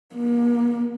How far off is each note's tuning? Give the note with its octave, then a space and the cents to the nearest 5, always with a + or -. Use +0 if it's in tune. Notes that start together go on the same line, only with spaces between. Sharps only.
A#3 +35